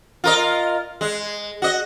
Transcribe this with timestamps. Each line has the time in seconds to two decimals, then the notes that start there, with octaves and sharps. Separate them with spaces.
0.24 F4 A#4 D#5
1.01 G#3
1.62 F#4 D#5